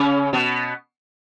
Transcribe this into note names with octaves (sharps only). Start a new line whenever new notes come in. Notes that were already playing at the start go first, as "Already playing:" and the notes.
Already playing: C#3 C#4
B2 B3